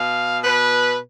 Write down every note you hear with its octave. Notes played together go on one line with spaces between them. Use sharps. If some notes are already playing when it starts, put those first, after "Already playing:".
Already playing: B2 F5
B2 B4